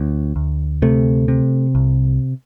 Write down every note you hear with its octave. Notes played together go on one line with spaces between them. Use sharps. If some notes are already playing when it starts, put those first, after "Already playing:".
Already playing: D2
D2
C3 A3
C3
C2